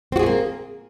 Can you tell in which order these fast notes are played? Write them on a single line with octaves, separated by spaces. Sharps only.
C4 F#4 G#4 A3 A#3